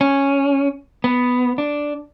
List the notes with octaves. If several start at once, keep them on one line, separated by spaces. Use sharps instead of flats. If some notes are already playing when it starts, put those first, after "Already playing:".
C#4
B3
D4